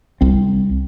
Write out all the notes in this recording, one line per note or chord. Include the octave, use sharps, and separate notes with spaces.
C2 C4